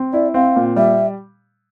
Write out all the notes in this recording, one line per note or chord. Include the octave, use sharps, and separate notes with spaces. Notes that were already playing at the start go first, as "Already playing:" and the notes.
Already playing: C4
E4 D5
C4 F5
A#2
G3 E5